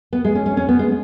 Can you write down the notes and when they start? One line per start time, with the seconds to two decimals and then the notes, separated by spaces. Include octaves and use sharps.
0.13 B3
0.24 G#3
0.35 C#4
0.46 C#4
0.57 C#4
0.69 B3
0.79 G#3